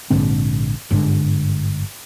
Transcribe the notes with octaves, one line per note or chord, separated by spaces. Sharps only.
A#1 G#2 D3 C4
G1 G#2 B2 D3